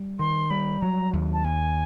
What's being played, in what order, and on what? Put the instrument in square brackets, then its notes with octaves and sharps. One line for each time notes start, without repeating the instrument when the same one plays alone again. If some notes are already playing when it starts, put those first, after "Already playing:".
Already playing: [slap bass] G3
[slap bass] D#3 [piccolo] C6
[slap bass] G3 [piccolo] B5
[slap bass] F#3 [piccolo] A#5
[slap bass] D#2
[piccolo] A5
[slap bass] D#2 [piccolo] G#5